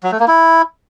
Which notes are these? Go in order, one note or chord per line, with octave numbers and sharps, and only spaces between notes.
F#3
A3
A#3
E4